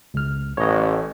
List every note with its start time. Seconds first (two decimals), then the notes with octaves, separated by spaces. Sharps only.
0.14 C#2 F6
0.57 A1 C#5 D#5